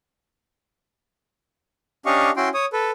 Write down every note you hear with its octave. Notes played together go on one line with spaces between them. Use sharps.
C#4 D4 G4 D#5 F5 C#6
C#4 E4 F#4 G5 C6
C#5 D#6
A4 B4